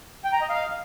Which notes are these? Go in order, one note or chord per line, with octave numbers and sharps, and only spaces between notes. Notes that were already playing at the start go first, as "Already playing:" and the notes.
G5
A#5
D#5
F5